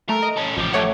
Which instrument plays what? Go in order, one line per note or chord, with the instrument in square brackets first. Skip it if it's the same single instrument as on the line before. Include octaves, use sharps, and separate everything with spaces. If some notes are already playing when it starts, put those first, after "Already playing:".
[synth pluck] A3 [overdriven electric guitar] A#4
[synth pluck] D#5
[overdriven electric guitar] C#4 A4
[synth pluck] A1 [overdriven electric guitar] F3 G4
[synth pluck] A3 C#5 F#5